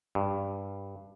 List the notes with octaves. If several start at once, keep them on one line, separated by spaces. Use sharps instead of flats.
G2